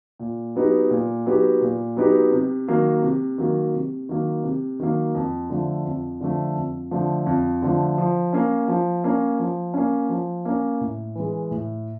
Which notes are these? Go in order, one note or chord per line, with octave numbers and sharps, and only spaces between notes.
A#2
F#3 B3 D#4 G4
A#2
F#3 B3 D#4 G4
A#2
F#3 B3 D#4 G4
C3
D#3 F#3 A#3
C3
D#3 F#3 A#3
C3
D#3 F#3 A#3
C3
D#3 F#3 A#3
F2
D3 F3 A3
F2
D3 F3 A3
F2
D3 F3 A3
F2
D3 F3 A3
F3
A#3 C#4
F3
A#3 C#4
F3
A#3 C#4
F3
A#3 C#4
A2
E3 G#3
A2